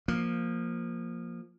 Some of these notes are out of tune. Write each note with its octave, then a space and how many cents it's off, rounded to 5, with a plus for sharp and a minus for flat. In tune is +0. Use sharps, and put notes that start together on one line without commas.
F3 +0 A#3 +0